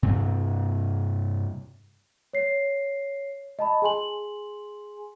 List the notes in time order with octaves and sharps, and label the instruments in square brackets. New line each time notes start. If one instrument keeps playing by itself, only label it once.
[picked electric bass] G2 C3 C4
[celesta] C#5 C7
D#5 A5 B5
G#4 G#5 C6 F#7